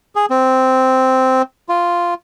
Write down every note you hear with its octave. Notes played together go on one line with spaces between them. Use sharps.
G#4
C4
F4